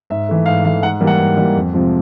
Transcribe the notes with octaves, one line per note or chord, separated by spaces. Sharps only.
G#2 E5
E3 A3
G#2 F5
E3 A3 F5
G#2 F#5
E3 G3 A#3
F#5
G#2
E3 G3 A#3
F2
C3 F3 G#3